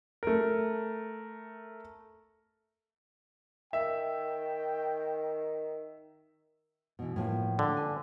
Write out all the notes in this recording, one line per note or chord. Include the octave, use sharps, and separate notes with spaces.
A3 A#4
D#3 E5 G5
B2 E3
A2 F3 A#3
D3
G#5